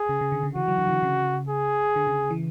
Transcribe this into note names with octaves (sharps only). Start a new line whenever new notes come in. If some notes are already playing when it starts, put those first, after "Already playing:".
Already playing: G#4
C#3
C#3
D3
C#3
E3 F#4
F#3
D3
E3
D3
C#3
G#4
D3
C#3
E3